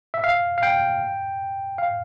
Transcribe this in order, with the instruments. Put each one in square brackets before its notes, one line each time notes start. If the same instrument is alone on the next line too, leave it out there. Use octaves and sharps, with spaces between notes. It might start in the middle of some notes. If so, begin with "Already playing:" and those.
[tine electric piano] E5
F5
F5
G5
F5